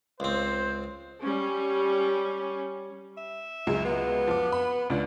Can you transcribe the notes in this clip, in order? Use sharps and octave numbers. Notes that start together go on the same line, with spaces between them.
C#2 C4 C5
G3 C#4
E5
C#2 F#3 G#3
B3
F3 D6
B5
C#2 D4